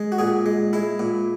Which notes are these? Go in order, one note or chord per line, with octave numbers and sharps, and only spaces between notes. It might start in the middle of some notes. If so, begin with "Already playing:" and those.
Already playing: G#3
F#4
A#2 G#4
G#3
G#3 E4
A#2